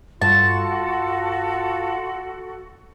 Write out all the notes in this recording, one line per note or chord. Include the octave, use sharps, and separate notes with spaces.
G2 F4 F#4 A4 A5